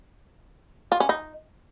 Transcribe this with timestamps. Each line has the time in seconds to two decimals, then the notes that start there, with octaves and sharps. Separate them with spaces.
0.92 F4
1.00 C#4
1.09 D#4